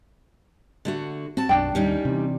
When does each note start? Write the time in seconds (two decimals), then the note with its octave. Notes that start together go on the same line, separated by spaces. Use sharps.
0.85 D3 A3 F#4
1.37 C4 F#4 A5
1.49 B1 F#2 D4 G5
1.75 D#2 G3 C#4 D#4
2.05 C3 E3